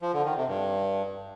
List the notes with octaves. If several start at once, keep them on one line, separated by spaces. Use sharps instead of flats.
F3
D3
D#3
C3
G2